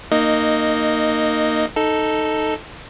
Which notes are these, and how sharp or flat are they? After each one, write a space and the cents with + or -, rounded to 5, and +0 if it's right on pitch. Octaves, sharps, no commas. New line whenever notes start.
A#3 -10 D#4 -15 D#5 +0
D#4 +0 A4 +0